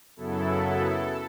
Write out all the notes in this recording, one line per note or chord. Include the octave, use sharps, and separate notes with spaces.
F#2 C#3 F#3 B3 E4 A4